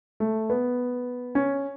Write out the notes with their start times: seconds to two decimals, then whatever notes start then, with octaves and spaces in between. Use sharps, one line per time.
0.20 A3
0.50 B3
1.35 C#4